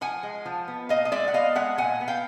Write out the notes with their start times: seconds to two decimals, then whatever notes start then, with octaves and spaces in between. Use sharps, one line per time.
0.01 F3 F#5 G#5
0.23 G#3
0.45 F3
0.68 B3
0.89 A#2 D#5 F5
1.05 D#5
1.12 G#3 D5 E5
1.28 F#5
1.34 B3 D#5 F5
1.55 G#3 E5 F#5
1.78 A#2 F#5 G#5
2.01 B3
2.08 F5 G5